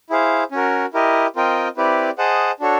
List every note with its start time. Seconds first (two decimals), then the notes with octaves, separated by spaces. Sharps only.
0.10 E4 G#4 C5 F5
0.52 C#4 F#4 A#4
0.94 E4 G4 A#4 D#5
1.36 C4 F4 A#4 D#5 G5
1.77 C4 E4 G4 B4 D5
2.18 G#4 C5 D#5 F#5 A5
2.60 D4 F#4 A4 C#5